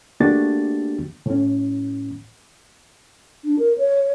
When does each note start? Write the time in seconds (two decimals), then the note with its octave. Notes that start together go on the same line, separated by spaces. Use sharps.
0.20 A3 A#3 D4 F#4 G4 A6
1.26 A2 C#4
3.44 D4
3.59 A#4
3.78 C#5